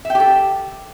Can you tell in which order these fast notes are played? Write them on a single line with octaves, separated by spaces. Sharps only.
E5 G5 G4 A4